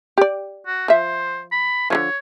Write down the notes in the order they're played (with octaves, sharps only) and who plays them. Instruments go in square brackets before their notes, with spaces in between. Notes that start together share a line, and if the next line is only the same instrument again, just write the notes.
[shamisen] G4 D5
[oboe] F#4
[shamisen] F3 E5 [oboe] C5
[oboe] B5
[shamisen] D3 E3 F3 [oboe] C#5